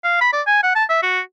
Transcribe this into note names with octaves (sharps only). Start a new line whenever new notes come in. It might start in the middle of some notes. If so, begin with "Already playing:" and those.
F5
B5
D5
G#5
F#5
A5
E5
F#4